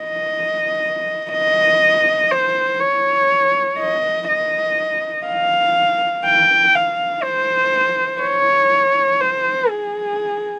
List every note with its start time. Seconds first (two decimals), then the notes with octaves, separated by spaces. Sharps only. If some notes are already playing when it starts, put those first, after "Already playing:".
Already playing: D#5
1.32 D#5
2.31 C5
2.80 C#5
3.78 D#5
4.29 D#5
5.27 F5
6.25 G5
6.75 F5
7.23 C5
8.22 C#5
9.21 C5
9.70 G#4